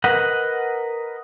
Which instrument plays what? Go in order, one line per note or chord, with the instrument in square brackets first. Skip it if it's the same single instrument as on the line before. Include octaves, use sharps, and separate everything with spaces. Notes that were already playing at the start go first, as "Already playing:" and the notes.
[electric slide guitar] A#4 B4 D#5 F#5